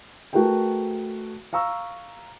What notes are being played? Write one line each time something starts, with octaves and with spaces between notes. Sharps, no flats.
A3 F#4 G#4 A#4 B4 G5
F5 A#5 C#6 E6